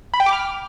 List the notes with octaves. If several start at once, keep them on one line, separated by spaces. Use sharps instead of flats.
B5
G5
D6
F6